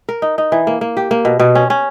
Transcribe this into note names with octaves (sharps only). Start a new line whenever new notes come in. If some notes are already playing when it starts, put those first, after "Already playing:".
A#4
D#4
D#4
E3
A#3
A#3
G4
A#3
B2
B2
C#4
C#4